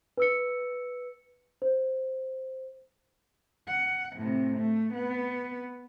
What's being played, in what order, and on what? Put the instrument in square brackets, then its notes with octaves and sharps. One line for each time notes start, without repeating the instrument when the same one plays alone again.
[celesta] B4 E6 C#7
C5
[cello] F#5
A2 C3
A3
B3